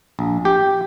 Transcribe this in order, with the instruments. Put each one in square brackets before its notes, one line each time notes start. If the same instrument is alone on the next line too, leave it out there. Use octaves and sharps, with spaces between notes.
[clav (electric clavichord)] A#1
G4